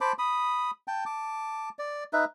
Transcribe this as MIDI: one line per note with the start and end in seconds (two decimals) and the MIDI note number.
0.01 0.13 72
0.01 0.13 81
0.01 0.13 83
0.01 0.13 86
0.19 0.71 83
0.19 0.71 87
0.88 1.04 79
0.88 1.04 81
1.06 1.69 81
1.06 1.69 86
1.79 2.04 74
2.13 2.25 63
2.13 2.25 71
2.13 2.25 76